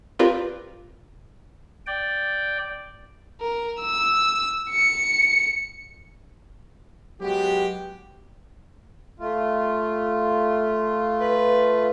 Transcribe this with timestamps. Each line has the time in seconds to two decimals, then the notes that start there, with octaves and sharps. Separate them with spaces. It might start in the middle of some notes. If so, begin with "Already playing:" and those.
0.19 C4 F4 G4 A#4 B4 D5
1.87 D5 G5
3.40 A#4
3.80 E6
4.70 C#7
7.21 F#3 G#3 B3 F#4 G4
9.20 A3 F4
11.20 B4